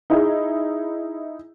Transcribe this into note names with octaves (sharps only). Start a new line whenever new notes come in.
D#4 E4 G#4